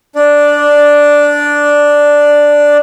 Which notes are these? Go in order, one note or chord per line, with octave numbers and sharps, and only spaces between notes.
D4 D5